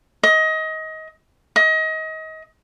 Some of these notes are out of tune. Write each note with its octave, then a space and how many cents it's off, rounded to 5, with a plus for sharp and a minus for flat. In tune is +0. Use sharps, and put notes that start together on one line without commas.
D#5 +25
D#5 +30